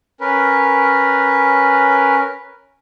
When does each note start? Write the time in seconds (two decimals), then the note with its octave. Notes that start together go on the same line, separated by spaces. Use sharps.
0.21 C#4 A#4 B4